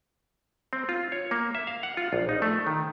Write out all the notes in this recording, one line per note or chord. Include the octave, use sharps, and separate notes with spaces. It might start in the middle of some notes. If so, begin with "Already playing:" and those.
C4
F4
C#5
A#3
E5
F5
F#5
F4
A#1
D#4
A3
D#3